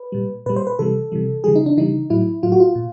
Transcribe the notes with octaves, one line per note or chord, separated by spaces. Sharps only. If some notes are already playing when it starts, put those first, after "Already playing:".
Already playing: B4
A#2 G3
A#2 G3 B4
C5
B4
C3 E3 G3 A4
C3 E3 G3
C#3 E3 G3 G#4
D#4
D4
C#3 E3 G3 D#4
A2 F#3 E4
A2 F#3 F4
F#4
F4
A#2